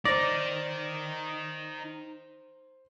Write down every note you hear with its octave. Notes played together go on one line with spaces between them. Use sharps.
D#4 A#4 C5 D5 A#6